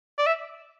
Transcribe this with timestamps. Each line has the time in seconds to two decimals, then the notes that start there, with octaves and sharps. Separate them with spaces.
0.18 D5
0.26 E5